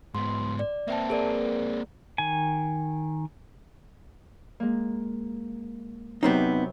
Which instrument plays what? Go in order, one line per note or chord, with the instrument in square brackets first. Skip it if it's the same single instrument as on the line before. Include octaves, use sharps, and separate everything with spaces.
[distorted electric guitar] G#2 B3 [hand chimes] C6
[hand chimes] D5
[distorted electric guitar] A#3 C4 [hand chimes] E5 G5 A5
[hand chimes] G#4 A#4 D5
[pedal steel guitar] D#3 G#5
[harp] G#3 A#3
[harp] F#2 C3 B4 [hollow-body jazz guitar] B3 C4 D#4